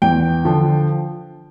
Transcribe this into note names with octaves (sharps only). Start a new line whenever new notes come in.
E2 G5
D3 F3